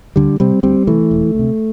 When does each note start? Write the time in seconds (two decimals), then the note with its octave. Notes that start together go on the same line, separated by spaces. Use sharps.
0.16 D2 D3 G3
0.40 C3 G3 C4
0.63 D2 G3 C4
0.87 C3 E3 A3
1.11 E1
1.35 D2 C3